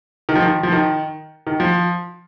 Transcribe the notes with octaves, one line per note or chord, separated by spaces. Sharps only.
D#3
F3
D#3
F3
D#3
D#3
F3